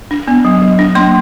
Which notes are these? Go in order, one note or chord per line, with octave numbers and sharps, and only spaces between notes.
D4
B3
F#3
F#3
D4
A#3 C6